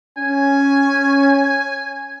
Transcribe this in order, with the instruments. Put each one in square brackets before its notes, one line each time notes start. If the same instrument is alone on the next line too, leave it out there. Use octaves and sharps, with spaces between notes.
[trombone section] C#4 [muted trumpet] G#5